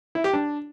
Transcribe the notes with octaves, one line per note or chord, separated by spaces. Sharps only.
E4
G4
D4